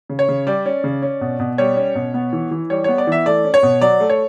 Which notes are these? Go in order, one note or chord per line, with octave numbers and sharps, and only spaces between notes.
C#3
C#5
C#3
G3 D5
C#4
C#3
C#4
B2
B2
G3 C#5
C#4
B2
B3
E3
E3
G3 C#5
B3 C#5
D5
E3 E5
A3 D5
C#4
C#5
B2
F#3 D5
A3
C#5